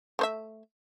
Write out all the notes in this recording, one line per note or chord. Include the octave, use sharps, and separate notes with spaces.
A3 C5 E5